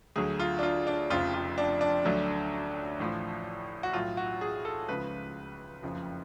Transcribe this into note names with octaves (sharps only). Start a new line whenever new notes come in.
D2 D3 F#3 G#4
F4
D4
F4
D4
F1 F2 C#3 F3 F4
F4
D4
D4
D2 D3 F#3
A1 A2 F3
F#4
B1 A2 F#3 F4
F#4
G#4
A4
C#2 C#3 F3 B4
F#1 F2 C#3 F3